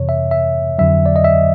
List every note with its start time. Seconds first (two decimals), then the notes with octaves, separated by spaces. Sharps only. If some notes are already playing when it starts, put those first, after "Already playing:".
Already playing: F2 C3 E3 C#5
0.09 E5
0.31 E5
0.79 F2 D3 F#3 E5
1.06 D5
1.16 D#5
1.24 E5